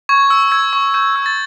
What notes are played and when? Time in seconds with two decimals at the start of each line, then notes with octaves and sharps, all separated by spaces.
0.09 C#6 G#6
0.30 E6
0.52 E6 G#6
0.73 C#6
0.94 C#6 G6
1.16 E6
1.26 A6